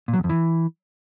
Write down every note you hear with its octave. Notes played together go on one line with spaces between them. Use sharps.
A#2
F#3
E2
F2
E3